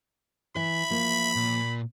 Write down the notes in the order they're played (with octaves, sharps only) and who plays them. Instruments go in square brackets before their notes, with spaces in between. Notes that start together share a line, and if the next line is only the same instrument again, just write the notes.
[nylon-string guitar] E3 [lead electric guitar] E5 [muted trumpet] B5
[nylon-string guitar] F3 A#3
[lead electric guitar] A#2